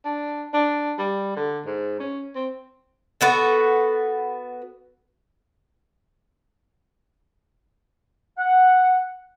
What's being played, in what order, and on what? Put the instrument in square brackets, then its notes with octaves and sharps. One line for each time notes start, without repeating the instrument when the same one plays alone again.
[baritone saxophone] D4
D4
G3
D3
G#2
C#4
C4
[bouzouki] B3 F#4 A4
[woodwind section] F#5